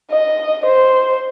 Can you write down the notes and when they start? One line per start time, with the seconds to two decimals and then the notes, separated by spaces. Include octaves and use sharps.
0.11 D#5
0.66 C5